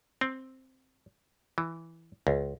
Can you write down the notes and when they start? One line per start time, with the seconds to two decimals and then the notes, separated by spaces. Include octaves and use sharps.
0.21 C4
1.58 E3
2.27 C#2